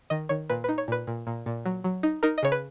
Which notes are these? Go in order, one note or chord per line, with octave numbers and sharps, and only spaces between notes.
D#3 D#5
D#3 C#5
A#2 B4
B4
D#4
C#5
A#2 B4
A#2
A#2
A#2
F#3
F#3
D#4
D#4 A#4
D#5
C#3 C#5
B4